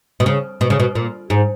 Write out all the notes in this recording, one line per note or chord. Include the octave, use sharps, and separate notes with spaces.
B2
C#3
B2
C#3
B2
A#2
G#2